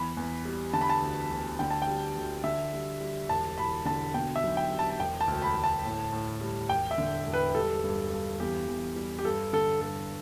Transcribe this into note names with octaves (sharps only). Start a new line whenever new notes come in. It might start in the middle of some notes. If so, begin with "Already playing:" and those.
Already playing: E2 B5
E2
G3
D3 A5
B5
A5
D2
D2
D3 G5
A5
G5
G3
D2
D3 E5
G3
G3
E1 A5
E1 B5
D3 A5
B2 G5
E5
B1
G5
G3
A5
A5
E1 G5
A5
D2
B5
D2
A5
A2
A2
G3
E1 G5
E5
D3
E1
B4
G3 A4
G2
G2
E2 G4
E2
G3
G4
G2 A4
D3 A4
G2 A4